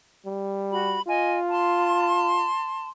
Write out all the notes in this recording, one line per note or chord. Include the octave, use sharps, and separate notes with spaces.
G3
F#4 B5
F4 D#5 G#5
A5 C6